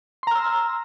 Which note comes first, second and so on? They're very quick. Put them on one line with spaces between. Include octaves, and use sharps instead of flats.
C6 A#5 F6 E6